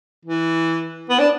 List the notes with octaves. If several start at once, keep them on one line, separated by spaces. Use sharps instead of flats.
E3
B3
D4